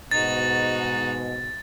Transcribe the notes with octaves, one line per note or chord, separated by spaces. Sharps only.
G#2 B2 D#4 F#4 A6